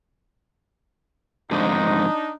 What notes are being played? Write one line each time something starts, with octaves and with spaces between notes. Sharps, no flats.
F2 G#2 D3 D4 D#4